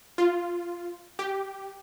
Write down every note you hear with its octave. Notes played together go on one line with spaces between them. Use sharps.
F4
G4